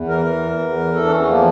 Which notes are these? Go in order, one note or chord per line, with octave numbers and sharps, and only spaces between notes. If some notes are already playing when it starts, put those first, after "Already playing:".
Already playing: E2
E3 A#4
E3
E2
E2
E3
E3 A4
D4
E2 C#4
C#4
F3 A#3